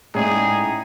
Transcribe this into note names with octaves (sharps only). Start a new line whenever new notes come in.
A2 G#3 C#4 D#4 G#4 D5